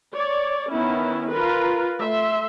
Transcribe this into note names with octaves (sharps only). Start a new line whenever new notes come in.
C#5 D5
D#3 B3 C#4 E4
F4 A#4 B4
A3 E5 C6